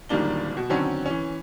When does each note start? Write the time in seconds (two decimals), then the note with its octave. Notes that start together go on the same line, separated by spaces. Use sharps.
0.09 D1 D#3 G3 A#3 D4 G7
0.57 B2
0.70 D3 D#3 F#3 C4 C#4
1.06 E3 C#4